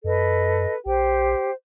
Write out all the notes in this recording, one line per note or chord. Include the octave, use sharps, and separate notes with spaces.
F#2 A4 B4 D#5
A#1 G4 C5 G5